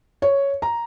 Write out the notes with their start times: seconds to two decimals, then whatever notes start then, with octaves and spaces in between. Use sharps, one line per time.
0.22 C#5
0.62 A#5